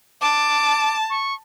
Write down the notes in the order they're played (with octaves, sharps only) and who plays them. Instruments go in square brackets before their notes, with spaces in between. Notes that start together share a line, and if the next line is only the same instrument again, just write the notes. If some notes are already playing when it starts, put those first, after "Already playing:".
[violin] A5 [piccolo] D6
[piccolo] C#6